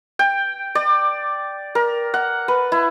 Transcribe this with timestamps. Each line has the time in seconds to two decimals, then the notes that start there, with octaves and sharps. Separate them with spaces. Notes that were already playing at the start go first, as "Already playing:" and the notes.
0.19 G5
0.75 D5
1.75 A#4
2.14 F#5
2.48 B4
2.72 E4